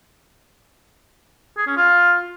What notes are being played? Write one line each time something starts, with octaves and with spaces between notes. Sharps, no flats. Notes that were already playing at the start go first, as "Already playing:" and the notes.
G#4
C#4
F4